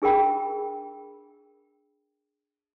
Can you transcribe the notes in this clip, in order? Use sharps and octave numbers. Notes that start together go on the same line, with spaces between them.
D4 G#4 A#4 G5 B5